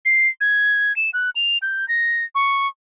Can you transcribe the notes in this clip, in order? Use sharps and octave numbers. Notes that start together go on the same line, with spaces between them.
C7
G#6
E7
F#6
F7
G6
A#6
C#6